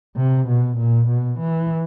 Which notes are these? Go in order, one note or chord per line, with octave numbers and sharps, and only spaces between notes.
C3
B2
A#2
B2
E3